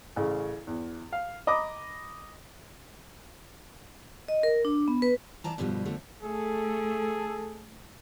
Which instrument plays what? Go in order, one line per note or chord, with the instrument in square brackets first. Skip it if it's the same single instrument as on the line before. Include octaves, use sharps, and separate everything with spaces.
[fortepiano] A1 C#3
E2
F5
D#5 A#5 B5 D6
[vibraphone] D#5
A#4
D4
B3
B4
[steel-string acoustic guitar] E3 D5 A5 A#5
G2 B2 D3 F3 G3
D3 F3 A3
[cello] A3 [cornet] G#4 [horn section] A4